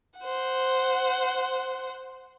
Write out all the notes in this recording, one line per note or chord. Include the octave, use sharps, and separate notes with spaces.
C5 F#5